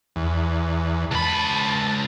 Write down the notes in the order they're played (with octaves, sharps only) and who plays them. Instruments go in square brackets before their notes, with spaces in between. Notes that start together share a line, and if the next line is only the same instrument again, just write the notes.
[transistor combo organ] E2
[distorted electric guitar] C#2 B5 [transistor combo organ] A5